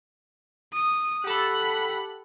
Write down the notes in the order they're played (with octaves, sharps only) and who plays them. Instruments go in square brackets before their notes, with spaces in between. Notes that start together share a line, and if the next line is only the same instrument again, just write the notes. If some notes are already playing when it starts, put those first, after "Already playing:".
[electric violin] D#6
[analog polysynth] G4 A4 [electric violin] F#5 B5